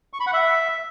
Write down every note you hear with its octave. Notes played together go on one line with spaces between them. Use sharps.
C#6
B5
F#5
E5